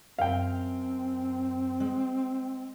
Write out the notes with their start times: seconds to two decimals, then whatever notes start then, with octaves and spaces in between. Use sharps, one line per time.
0.19 F#2 C4 F5 G5 A#5
1.80 G#3